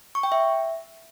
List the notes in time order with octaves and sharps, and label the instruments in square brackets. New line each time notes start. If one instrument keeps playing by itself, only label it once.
[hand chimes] C#6
G5
E5